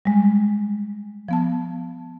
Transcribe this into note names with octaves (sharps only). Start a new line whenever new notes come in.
G3 G#3
F3 B3 A5